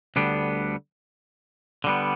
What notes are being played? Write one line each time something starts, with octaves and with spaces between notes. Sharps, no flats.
D2 D3 G3 B3 D4
D3 G3 B3